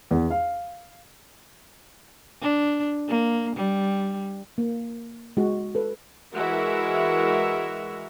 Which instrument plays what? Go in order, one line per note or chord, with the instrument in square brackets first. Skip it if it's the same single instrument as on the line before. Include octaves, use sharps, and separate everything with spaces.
[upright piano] E2
F5
[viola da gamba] D4
A#3
G3
[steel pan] A#3
G#3 F#4
A4 B4
[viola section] E3 G#3 E4 F#4 A#4 E5